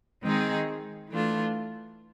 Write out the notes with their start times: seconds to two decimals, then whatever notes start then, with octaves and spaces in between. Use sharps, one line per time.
0.23 D#3 G#3 C4 D#4 G#4
1.09 E3 A3 D4 F4